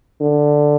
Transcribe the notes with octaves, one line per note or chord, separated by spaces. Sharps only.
D3